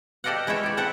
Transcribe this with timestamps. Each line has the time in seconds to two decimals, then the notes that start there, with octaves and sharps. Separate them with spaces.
0.24 G4 A4 D5 D#5 F5 F#5
0.47 G#3 E4 B4 C#5 E5
0.63 G4 D5
0.77 C4 A4 E5 F#5